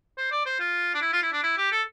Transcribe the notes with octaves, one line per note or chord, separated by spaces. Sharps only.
C5
D5
C5
F4
D4
E4
F4
E4
D4
E4
G4
A4